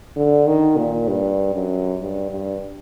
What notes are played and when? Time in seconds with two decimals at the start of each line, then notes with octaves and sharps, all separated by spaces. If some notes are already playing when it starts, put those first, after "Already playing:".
0.16 D3
0.47 D#3
0.77 A#2
1.08 G2
1.54 F#2
2.01 G2
2.30 G2